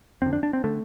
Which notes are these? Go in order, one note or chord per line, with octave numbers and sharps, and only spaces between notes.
F2 D3 C4
D4
D4
C4
D3 A3